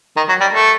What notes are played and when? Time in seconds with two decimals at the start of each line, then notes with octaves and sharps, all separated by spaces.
0.16 D#3
0.29 F#3
0.41 G3
0.53 A3